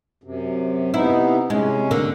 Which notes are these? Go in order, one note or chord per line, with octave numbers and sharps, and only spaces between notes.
F#2 C3
C3 B3 D#4 E4
C3 G#3 C#4
D3 A#3